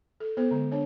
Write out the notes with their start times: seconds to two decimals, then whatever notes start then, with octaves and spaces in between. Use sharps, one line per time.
0.20 A4
0.37 B3 A4 C5
0.51 D3 G#3
0.72 D4 C#5